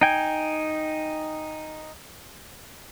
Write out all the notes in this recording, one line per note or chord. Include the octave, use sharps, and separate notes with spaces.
D#4 G5 G#5